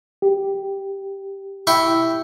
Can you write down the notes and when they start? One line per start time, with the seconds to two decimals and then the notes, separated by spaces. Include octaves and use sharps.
0.22 G4
1.67 E4 G5 C#6